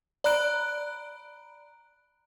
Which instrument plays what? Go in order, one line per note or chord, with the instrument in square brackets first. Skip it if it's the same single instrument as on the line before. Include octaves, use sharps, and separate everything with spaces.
[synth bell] D5 A#5 B5 F#6 D7